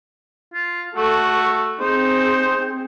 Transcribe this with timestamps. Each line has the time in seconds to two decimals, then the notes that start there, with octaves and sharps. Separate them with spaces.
0.54 F4
0.97 A3 F#4 A4
1.80 C4 D#4 G#4 C5